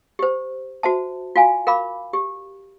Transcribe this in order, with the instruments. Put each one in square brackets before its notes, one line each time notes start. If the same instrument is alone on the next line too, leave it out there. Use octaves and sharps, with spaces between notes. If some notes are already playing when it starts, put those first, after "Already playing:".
[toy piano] G4 C5
F#4 C5 E5 A5
F4 F#4 F5 G#5
A#4 F5 B5 D6
G4